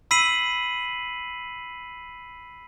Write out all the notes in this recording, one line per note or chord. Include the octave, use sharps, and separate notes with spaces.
B5 E6 B6 C7 D#7 F#7